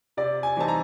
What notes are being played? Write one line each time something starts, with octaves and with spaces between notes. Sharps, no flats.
C3 D5
G#5
E3 G3 C4 D#4 A5
A#5